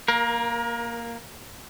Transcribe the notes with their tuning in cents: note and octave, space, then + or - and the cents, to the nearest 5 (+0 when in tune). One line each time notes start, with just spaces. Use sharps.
A#3 +0 A#4 +30